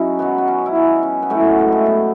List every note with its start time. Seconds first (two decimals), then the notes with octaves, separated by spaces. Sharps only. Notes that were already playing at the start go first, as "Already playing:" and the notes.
Already playing: F#2 C#4 D#4 E4 F#4 G#4
0.19 B2 F#3 B3
0.38 B3
0.47 C#4
0.66 E4
0.75 D#4
1.03 C#4
1.22 B3
1.30 A2 F#3 A3
1.41 A3 B3
1.59 G#3
1.72 A3
1.86 B3